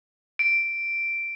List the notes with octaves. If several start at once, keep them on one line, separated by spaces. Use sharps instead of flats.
D7